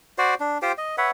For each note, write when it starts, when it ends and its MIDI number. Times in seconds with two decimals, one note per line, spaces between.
0.18 0.34 66
0.18 0.34 72
0.18 0.34 74
0.40 0.58 62
0.62 0.72 65
0.62 0.72 67
0.62 0.72 72
0.62 0.72 79
0.78 0.96 75
0.98 1.11 71
0.98 1.11 73
0.98 1.11 76
0.98 1.11 78